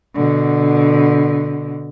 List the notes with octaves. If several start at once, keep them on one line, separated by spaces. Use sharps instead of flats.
B2 D3